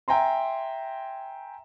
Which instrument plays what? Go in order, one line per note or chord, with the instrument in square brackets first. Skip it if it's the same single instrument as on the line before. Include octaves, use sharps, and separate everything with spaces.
[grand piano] E5 G5 G#5 A#5 C6